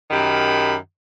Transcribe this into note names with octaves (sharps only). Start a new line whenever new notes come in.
F#2 D#3 G4 B5